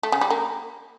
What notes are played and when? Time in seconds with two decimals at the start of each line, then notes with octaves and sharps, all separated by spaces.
0.03 A3
0.12 C#3
0.21 G3
0.30 A#3